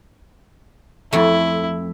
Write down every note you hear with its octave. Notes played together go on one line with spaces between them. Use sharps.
F2 A3 E4